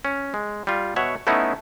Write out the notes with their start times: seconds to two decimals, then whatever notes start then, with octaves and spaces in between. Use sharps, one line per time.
0.05 C#4
0.34 G#3
0.67 G3 F4
0.96 B2 C#5 E5 F#5
1.27 A3 B3 C#4 D#4 E4